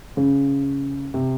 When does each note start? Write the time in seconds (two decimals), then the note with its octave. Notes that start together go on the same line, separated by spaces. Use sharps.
0.17 C#3
1.14 C3